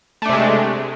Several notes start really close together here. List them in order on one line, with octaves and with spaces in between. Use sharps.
A3 D4 C3 G#3